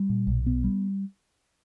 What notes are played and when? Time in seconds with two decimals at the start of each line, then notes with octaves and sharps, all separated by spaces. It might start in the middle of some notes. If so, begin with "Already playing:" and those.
Already playing: G3
0.09 A#2
0.27 B1
0.46 B3
0.64 G3